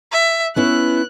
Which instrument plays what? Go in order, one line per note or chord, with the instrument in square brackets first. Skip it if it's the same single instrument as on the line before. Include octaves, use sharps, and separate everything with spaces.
[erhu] E5
[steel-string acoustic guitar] B3 C#4 E4 [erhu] F#6